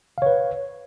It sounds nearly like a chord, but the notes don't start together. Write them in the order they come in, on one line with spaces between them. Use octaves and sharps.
F5 C#5 B4